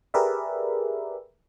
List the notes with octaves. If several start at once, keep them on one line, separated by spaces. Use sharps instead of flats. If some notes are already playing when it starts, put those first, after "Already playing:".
G4 G#4 A#4 B4 D5 E5